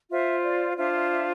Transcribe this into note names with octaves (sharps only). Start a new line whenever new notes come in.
F4 C5 E5
D5
D4 F4 C5 E5
E5
E5